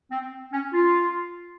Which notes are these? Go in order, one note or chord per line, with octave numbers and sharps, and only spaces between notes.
C4
C#4
F4